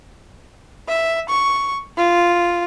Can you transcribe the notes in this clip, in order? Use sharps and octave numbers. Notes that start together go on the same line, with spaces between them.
E5
C#6
F4